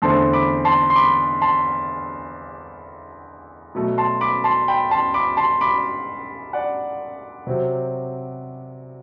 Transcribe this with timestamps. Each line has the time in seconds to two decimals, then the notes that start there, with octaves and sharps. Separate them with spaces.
0.02 E2 D3 A3 C4 A5 C6
0.33 B5 D6
0.65 A5 C6
0.90 C6
0.96 B5 D6
1.41 A5 C6
3.75 B2 F#3 A3
3.98 A5 C6
4.21 B5 D6
4.44 A5 C6
4.68 G5 B5
4.91 A5 C6
5.14 B5 D6
5.37 A5 C6
5.61 B5 D6
6.53 D5 F#5
7.47 C3 F#3 C4